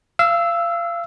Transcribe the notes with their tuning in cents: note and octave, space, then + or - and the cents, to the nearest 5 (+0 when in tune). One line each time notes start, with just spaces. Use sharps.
F5 -30 E6 +0